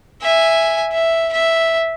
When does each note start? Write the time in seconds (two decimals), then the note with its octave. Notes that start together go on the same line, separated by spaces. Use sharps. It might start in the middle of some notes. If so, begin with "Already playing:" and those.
0.22 E5 G#5
0.92 E5
1.33 E5